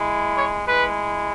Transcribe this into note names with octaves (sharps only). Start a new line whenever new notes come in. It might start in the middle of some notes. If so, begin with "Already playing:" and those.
Already playing: G#3 E4
C#5
G#3 E4 B4